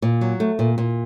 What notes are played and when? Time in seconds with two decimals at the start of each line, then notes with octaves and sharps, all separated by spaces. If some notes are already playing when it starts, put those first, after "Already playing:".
0.02 A#2
0.21 F#3
0.40 A3
0.59 A#2
0.78 A#2